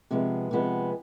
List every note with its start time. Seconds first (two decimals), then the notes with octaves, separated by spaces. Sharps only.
0.11 C3 F3 G#3 B3
0.51 C3 F3 G#3 B3